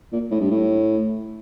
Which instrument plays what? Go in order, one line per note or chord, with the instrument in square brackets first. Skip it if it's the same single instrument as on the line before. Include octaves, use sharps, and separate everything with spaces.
[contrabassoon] A#2
A2
G2
A2